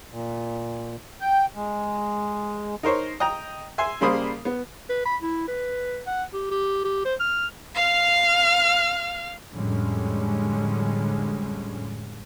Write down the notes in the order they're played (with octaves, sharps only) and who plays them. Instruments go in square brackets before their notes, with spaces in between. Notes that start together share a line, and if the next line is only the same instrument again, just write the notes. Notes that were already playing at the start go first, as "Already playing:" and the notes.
[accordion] A#2
G5
G#3
[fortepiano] D#4 A#4 C5 C#5
D#5 G5 A#5
E5 G#5 C6
C#3 G3 A#3 C5 B5 D#6
B3
[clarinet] B4
B5
E4
B4
F#5
G4
G4
G4
C5
F6
[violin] F5 F6
[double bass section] F2 A2 D3 G3 G#3 C#4